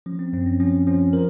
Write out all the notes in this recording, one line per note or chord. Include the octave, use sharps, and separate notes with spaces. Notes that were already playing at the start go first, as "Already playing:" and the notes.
F3 C#4
C4
F#2 C4
C#4
F3 C#4
F3 C#4
F3 A#4